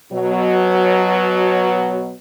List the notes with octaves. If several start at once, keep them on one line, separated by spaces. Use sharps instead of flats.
B2 F#3